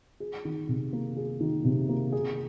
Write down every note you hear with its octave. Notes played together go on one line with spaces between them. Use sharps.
G#4
D#3
C3
A#3
G#4
D#3
C3
A#3
G#4